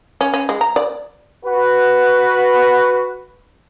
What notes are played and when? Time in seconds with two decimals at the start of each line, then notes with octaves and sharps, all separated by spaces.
0.21 C#4
0.34 C#4
0.49 G#3
0.61 A#5
0.76 D5
1.45 F#4 B4